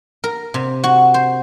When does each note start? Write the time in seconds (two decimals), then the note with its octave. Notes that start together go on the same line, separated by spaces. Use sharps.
0.24 A#4
0.54 C3
0.84 F#4
1.14 C5